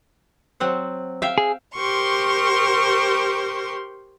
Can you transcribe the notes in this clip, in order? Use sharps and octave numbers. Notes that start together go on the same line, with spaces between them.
F#3 C4 F#5
E5 F5 G5
G#4
G4 A#4 C5 C6 C#6